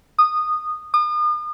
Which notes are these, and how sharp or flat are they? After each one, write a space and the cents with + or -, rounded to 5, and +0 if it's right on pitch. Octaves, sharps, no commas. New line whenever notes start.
D#6 -15
D#6 -40